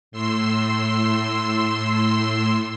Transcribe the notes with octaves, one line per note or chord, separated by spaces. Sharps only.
A2 C6 E6